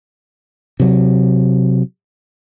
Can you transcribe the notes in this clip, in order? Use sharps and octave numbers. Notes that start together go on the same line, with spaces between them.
C3 F#3